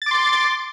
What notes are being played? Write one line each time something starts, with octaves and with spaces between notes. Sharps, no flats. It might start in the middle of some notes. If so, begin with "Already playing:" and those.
C6 D6 A6